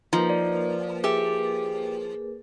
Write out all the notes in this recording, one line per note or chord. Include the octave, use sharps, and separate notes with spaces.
F3 A#3 D#4 A#4 B4
D5
G4 G#4 E5